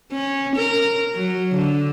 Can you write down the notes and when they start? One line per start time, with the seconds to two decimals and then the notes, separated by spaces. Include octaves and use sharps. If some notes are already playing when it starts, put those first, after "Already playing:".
0.12 C#4
0.56 A#4
1.15 F#3
1.55 D3